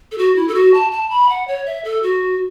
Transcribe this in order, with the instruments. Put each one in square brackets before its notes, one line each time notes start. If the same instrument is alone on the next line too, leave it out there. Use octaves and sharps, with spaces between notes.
[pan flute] A4
F#4
E4
A4
F#4
A5
A5
B5
F#5
C#5
E5
A4
F#4